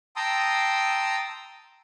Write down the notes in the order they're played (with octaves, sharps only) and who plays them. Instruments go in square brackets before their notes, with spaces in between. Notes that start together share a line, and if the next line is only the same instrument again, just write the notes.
[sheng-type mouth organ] G5 A5 A#5 C6 D#6 E6